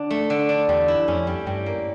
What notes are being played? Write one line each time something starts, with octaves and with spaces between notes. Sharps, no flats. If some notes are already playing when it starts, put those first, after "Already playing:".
Already playing: D3 D4
A3
D3
D4
E2 G3
E4
F2 C#4
G3
G2 G3
A#3